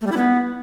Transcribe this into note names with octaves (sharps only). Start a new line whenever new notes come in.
A3
G3
E4
B3